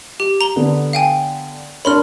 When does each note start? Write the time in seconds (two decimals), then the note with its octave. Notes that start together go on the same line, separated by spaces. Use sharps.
0.20 G4
0.41 A#5 G7
0.56 D3 B3
0.93 F5 G5 G#5
1.85 D4 A#4 C#5 B5 C6 F6